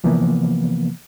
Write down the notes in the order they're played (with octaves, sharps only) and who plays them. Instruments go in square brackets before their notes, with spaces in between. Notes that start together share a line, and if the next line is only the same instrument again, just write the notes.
[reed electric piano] C3 E3 F3 A#3 B3